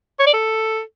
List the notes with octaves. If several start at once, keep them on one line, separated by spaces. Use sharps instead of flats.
C#5
D5
A4